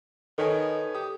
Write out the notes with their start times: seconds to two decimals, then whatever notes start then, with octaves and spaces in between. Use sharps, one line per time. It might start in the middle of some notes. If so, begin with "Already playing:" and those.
0.38 D#3 A4 B4 C#5 G#5
0.95 G4 D#6